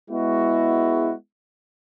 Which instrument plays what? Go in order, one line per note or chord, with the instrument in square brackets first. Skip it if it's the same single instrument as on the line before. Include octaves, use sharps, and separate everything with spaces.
[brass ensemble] G#3 B3 E4 F#4